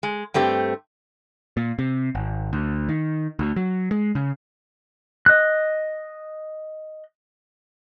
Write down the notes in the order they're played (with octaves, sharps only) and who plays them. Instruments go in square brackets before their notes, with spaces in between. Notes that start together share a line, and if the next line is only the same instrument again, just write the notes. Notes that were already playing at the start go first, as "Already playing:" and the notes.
[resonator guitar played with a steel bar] G#3
G2 A3 C4 G4
[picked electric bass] A#2
C3
G#1
D2
D#3
D2
F#3
G#3
C#3
[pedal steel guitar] D#5 F#6